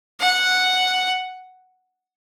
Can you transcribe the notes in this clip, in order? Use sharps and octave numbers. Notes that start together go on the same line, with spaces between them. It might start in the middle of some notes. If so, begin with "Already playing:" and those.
F#5